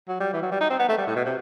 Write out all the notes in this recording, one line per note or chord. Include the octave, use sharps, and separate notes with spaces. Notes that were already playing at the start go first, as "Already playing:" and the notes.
F#3
G3
E3
F#3
G3
D#4
C4
B3
A3
G3
A2
B2
C3